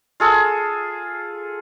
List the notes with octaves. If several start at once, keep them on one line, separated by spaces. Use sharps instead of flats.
F4 G#4 A4